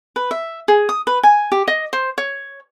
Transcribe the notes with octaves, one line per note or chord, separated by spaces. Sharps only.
B4
E5
G#4
D#6
B4
G#5
G4
D#5
C5
C#5